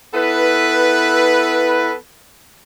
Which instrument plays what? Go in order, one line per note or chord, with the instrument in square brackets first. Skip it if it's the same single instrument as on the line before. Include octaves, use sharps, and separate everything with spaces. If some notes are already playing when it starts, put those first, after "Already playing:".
[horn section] B3 E4 A4 B4